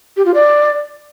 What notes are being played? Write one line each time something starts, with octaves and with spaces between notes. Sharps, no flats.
G4
F4
D5